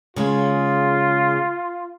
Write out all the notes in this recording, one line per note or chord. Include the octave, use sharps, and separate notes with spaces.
C#3 G#3 F4